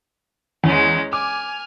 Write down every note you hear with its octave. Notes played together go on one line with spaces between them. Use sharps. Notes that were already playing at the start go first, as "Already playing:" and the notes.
E2 G#3 C#4
G#5 D6 F6